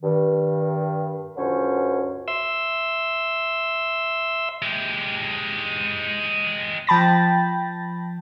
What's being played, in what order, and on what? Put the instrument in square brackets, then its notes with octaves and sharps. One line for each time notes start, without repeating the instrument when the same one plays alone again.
[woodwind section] G2 D#3
C#2 F#2 D3 C#4 C5 C#5
[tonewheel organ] E5 C6 E6
[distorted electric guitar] G#3 G4
[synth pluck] F3 G5 A5 B5 A6 A#6